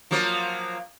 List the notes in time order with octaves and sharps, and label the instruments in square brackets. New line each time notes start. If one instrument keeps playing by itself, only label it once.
[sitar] F3 F#3 A#3